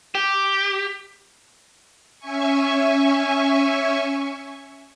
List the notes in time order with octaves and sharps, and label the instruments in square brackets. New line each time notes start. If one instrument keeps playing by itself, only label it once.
[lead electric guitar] G4
[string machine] C#4 E5 G#5 C#6